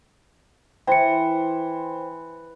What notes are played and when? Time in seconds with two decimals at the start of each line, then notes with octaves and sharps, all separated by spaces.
0.87 E3 C5 G5 C#7